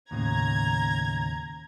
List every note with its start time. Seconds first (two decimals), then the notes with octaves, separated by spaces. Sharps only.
0.11 D#2 A2 C#3 A#5 G#6